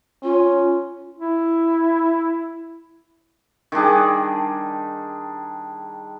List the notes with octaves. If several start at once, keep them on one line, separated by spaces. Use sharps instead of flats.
C#4 F4
E4
D#3 G3 D4 G#4